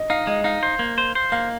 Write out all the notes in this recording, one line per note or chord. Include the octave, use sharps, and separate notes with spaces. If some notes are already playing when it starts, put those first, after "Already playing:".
Already playing: D#5
D#4 F5
G#3 D#5
D#4 F5
C5
A#3
C5
C5
A#3 F5